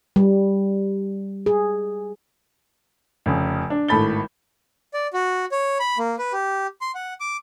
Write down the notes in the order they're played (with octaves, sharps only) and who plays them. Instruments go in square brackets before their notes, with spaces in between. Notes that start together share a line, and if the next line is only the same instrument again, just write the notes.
[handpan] G3
G#4
[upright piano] F1 C#3
D4
G#1 A2 A4 B5 A6 G7
[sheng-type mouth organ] D5
F#4
C#5
B5
A#3
B4
G4
C6
F#5
D6